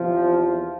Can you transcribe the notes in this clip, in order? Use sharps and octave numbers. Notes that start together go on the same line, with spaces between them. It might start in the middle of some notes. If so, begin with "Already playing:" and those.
Already playing: E2 C3 F3